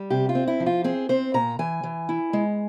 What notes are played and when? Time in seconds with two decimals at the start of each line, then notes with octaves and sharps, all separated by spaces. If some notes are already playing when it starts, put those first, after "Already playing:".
Already playing: G3
0.10 C3 G4
0.29 F4
0.35 C4
0.47 E4
0.60 F3
0.66 F4
0.84 C4 G#4
1.09 C4 C5
1.34 A#2 A#5
1.59 E3 G#5
1.83 E3
2.09 E4
2.33 G#3